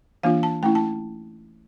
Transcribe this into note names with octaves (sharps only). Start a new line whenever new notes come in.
E3 A#3 D4 F4 F5
A5
A3 C#4 E4 G5
A5